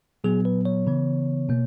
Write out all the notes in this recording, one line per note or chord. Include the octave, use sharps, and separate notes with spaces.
A#2 F#3 B3 G#4
B4
C#5
C#3 E3 B3
B2 A#3